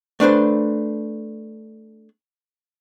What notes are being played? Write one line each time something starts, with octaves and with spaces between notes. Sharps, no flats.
A3 D4 B4 C5